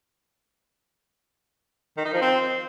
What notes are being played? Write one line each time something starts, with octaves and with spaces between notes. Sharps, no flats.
D#3
D#4
F3
C4